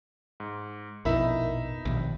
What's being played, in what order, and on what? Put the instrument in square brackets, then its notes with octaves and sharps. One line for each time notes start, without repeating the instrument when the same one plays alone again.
[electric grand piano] G#2
[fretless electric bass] A#1 F2 B2 [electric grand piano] D#4 E5 B5 [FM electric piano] E4 A#4
[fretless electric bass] A#1 D#2 [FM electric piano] B2